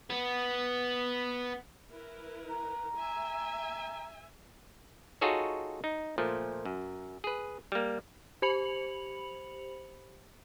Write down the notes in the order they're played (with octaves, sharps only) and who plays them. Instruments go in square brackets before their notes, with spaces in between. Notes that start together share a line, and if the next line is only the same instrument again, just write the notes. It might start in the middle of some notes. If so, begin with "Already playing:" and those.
[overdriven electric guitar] B3 B4
[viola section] E4 A#4 B4
[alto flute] A#5
[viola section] E5 G#5
[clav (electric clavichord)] D#4 F4 F#4 G#4 A4 C#5
D#4
A#2 F3 A3
F#2
G#4 B4
G3 A#3
[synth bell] G4 C5 B5 C#7 F7 F#7